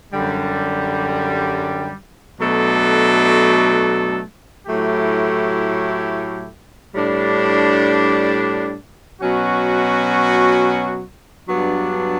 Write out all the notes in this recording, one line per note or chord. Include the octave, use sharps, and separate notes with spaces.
F#2 D3 G3
B2 F#3 A3 D4 A4
A2 F#3 A3 E4 G4
A2 G3 D4
B2 F#3 C#4 F#4
G2 F#3 B3 D4